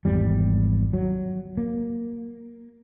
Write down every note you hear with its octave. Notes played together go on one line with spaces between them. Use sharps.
G#1 E2 G3
F#3
A#3